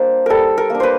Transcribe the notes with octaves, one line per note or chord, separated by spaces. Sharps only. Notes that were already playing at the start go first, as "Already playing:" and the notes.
Already playing: G3 A#3 D4 C5
G3 A4 A#4
A#4
A#3 D4
B4 C5